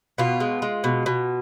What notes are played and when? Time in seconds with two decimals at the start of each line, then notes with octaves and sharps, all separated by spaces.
0.18 B2 F4
0.40 G#3
0.62 G#3
0.84 B2
1.06 B2